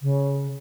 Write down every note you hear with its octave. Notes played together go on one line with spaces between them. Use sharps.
C#3